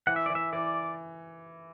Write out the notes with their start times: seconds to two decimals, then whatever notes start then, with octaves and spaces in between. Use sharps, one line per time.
0.07 E3 F#5
0.16 E5
0.26 E3 D5
0.35 E5
0.53 E3 D5